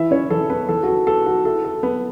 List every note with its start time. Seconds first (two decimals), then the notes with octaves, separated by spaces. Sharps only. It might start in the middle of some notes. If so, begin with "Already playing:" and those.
Already playing: E3 E4 E5
0.11 C#4 C#5
0.30 E3 A4
0.50 B3 B4
0.68 E3 A4
0.83 F#4
0.88 A4
1.07 B3 A4
1.26 F#4
1.45 E4 A4
1.64 A4
1.83 B3 B4